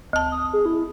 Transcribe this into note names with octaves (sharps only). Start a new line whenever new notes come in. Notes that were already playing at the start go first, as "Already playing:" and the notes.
D2 A5
D#6
G#4
E4